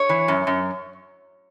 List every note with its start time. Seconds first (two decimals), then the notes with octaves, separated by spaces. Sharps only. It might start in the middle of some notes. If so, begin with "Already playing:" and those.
Already playing: C#5
0.09 E3
0.28 F#2
0.47 F#2